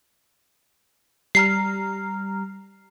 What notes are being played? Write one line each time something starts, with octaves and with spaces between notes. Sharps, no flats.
G3 A#5 F6 C7